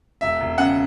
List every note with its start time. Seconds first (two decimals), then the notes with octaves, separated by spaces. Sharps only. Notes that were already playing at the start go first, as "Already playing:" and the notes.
0.21 E1 E5
0.41 E1
0.58 C#3 F#5